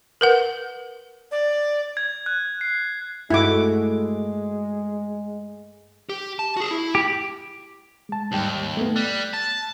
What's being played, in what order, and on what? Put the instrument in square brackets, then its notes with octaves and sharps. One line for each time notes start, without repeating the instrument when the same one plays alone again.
[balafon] A#4 B4 F#5
[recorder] D5
[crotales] G#6
F#6
C7
[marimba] G2 G#6 [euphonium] G#3 [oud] A3 F#4 [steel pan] E4 D6
[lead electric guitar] G4
A5
F#4 G#4
E4
[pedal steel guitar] G4
[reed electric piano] G#3 A5
[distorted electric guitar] D#2 [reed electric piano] G#2 G3 G5
[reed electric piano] A3 B3
[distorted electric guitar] G3 [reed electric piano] F#6
[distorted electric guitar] A5